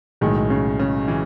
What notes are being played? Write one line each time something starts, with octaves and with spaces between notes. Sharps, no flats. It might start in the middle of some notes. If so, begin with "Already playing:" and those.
B1 A2 D#3 G#3
C#3
C#3
E3